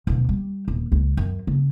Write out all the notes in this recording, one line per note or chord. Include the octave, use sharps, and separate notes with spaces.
D2 B2
G3
D#1
C#2
F#2
C#3